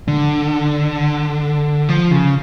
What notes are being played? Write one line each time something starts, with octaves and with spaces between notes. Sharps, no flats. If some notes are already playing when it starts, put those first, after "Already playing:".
D3
F3
C#3